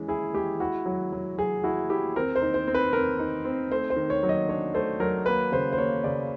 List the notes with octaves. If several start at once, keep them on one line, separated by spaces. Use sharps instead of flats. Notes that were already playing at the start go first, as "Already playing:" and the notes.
Already playing: E3 G#3 C#4
E4 G#4
G#3 G4
E4 F#4
F#3
F#3
F#3 G#4
E4 F#4
E4 G4
C4 A#4
C5
D#4
C5
C4
B4
C4 A#4
D#4
C4
A3 C5
C5
D#3
C#5
F#3
D#5
D4 C#5
A3 C5
F#3 A#4
A#3 B4
C#3 C5
C5
A#3 C#5
C#3 D5